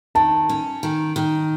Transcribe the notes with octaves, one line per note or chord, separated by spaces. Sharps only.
D#3 A5
C#4
D#3
D#3